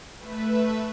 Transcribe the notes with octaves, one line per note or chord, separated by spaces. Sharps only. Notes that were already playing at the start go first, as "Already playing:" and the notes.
A3 B4 E5